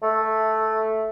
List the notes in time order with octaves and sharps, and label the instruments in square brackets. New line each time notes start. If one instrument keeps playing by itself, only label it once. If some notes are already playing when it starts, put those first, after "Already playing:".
[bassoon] A3